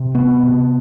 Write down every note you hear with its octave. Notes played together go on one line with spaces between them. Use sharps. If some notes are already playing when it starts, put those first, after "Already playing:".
Already playing: C3
B3
C3